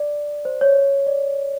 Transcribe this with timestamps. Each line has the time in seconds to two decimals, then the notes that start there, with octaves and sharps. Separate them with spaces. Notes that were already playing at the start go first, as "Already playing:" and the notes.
Already playing: D5
0.45 C5
0.61 C#5
1.06 D5